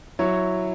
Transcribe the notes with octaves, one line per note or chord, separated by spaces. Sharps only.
F#3 E4 C#5